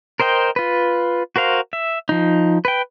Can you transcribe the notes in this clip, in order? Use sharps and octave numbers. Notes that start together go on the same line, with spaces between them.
A#4 C5 D#5 G5
F4 B4
F#4 A#4 C5 F5
E5
F3 D#4
B4 G5